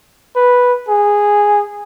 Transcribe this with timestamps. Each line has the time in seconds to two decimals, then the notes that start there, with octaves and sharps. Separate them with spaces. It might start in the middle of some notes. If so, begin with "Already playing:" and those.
0.36 B4
0.89 G#4